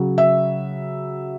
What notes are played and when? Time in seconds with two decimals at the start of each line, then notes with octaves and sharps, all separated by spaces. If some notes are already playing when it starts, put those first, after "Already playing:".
Already playing: C#3 F#3
0.18 E5